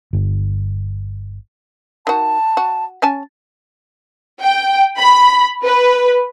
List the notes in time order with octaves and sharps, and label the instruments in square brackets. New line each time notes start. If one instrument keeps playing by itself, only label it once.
[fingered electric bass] G1
[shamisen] D#3 F#4 [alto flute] A5
[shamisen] F#4
C#4 G#5 A5
[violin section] G5
B5
B4